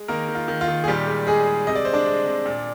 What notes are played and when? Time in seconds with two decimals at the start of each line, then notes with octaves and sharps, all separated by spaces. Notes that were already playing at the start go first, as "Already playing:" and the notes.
Already playing: G#3
0.08 D#3 A#3 A#4
0.28 D#3
0.35 F4
0.48 D#3
0.61 F4
0.68 D#3
0.84 G#4
0.88 A#2 G3 G4
1.07 G#3
1.27 G#3 G#4
1.47 G#3
1.67 C3 D#5
1.75 D5
1.85 G#3 C5
1.94 D4 D5
2.06 G#3
2.26 C3
2.46 A#2